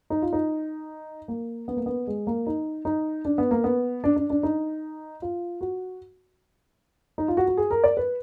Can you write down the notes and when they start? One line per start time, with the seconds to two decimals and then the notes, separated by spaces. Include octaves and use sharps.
0.10 D#4
0.22 F4
0.33 D#4
1.28 A#3
1.68 B3
1.77 A#3
1.86 B3
2.07 G#3
2.27 A#3
2.47 D#4
2.85 D#4
3.25 D4
3.38 B3
3.51 A#3
3.64 B3
4.04 D4
4.17 D4
4.30 D4
4.43 D#4
5.22 F4
5.61 F#4
7.18 D#4
7.28 F4
7.37 F#4
7.48 F#4
7.57 G#4
7.71 A#4
7.84 D5
7.97 B4